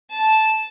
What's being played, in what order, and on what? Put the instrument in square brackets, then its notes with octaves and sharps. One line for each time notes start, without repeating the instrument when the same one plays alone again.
[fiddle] A5